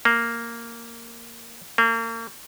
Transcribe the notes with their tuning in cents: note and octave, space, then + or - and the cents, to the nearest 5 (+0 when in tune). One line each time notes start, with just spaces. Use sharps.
A#3 -5
A#3 -35